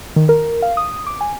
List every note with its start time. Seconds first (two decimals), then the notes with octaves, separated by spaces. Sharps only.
0.16 D#3
0.29 A#4
0.62 F5
0.77 D#6
1.07 D6
1.21 G#5